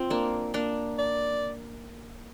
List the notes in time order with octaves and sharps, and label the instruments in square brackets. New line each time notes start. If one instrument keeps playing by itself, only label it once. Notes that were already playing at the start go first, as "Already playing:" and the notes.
Already playing: [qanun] C4 F4
A#3 D4
A#3 D4
[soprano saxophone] D5